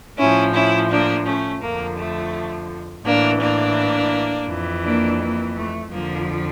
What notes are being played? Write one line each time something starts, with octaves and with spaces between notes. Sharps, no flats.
A2 F3 C#4 E4
C#4 E4
A#3 D4
A3 C#4
F2 D3 F3 A#3
A3
A2 E3 A#3 D4
A#3 D4
F2 E3
A#3 D4
A#3
A3
F2 D3 F3 A#3